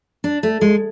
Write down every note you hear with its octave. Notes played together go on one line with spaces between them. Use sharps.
D4
A3
G#3